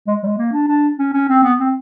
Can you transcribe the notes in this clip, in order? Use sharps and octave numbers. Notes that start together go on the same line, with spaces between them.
G#3
G3
G#3
A#3
D4
D4
C#4
C#4
C4
B3
C4